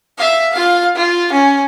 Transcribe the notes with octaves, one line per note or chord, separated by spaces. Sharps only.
E5 F5
F4 F5
F4
C#4